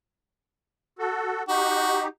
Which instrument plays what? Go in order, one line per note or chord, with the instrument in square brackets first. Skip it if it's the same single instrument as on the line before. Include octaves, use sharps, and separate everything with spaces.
[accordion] F#4 A4
[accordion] D#4 G4 [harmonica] F#4